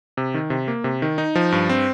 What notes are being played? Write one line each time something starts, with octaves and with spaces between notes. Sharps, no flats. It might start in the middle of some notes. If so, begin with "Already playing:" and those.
C3
D#3
C3
A#3
C3
D#3
D#4
F3
G2
C4